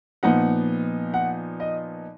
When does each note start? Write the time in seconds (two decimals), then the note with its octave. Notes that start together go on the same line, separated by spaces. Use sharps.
0.23 A#2 F3 B3 D#4 F#5
1.14 F#5
1.60 D#5